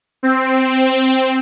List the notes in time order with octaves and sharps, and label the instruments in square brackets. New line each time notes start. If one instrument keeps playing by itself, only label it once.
[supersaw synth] C4